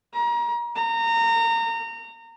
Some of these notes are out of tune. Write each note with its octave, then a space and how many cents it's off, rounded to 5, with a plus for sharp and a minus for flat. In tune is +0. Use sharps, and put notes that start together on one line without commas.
A#5 +35
A#5 -25